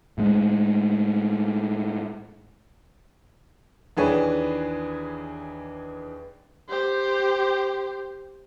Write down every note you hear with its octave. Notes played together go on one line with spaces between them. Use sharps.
A2 G#3
D#2 E3 D4 G#4 B4 C#5
G4 C5